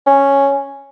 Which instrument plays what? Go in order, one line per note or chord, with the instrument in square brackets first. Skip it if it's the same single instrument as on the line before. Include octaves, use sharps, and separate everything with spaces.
[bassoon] C#4